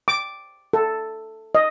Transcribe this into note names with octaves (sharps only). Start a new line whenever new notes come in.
D6
A4
D#5